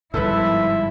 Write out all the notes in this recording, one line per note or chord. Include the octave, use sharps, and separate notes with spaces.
G1 G#2 F3 E4 A4 B4 E5